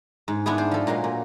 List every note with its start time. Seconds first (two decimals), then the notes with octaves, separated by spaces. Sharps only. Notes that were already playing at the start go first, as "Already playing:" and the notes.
0.28 G#2
0.46 G#2 B3 D4 E4 G#4
0.58 C5 D5
0.71 F3 A4
0.87 A#2 F#3 G#3 A#3
1.04 A#2